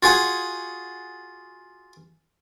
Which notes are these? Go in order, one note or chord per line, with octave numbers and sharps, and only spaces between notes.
F4 F#4 G#4